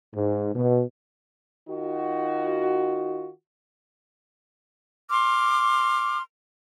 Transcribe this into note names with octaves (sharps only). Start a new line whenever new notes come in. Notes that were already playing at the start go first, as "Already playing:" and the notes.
G#2
B2
D#3 D#4 F4 F#4
C6 D6 F6